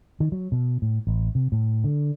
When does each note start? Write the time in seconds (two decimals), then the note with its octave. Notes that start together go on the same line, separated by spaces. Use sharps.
0.20 D#3
0.32 F#3
0.52 B2
0.82 A2
1.07 A1
1.35 C3
1.52 A2
1.84 D3